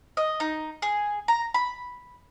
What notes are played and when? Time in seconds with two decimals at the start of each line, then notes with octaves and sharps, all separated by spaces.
0.17 D#5
0.40 D#4
0.82 G#4
1.28 A#5
1.54 B5